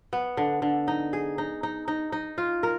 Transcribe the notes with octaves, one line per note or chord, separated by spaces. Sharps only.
B3
D3
D3
D#4
G#4
D#4
D#4
D#4
D#4
F4
A#4